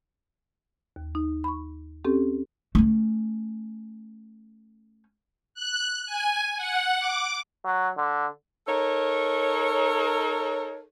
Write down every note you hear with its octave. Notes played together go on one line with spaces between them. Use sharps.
D#2
D#4
B5 C#6
C4 C#4 G4 A4
A3 C#4
F#6
G#5
F#5
D6
F#3
D3
D#4 A4 A#4 C#5